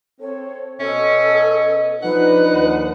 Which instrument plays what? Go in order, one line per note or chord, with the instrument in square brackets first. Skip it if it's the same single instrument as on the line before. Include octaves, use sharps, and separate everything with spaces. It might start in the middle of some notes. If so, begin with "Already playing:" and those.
[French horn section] C4 A4 [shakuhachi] C#5
[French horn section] B2 D#5 [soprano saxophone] C#4 [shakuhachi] A4
[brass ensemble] F3 D4 D#4 [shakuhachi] B4 [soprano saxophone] F#5
[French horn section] D#2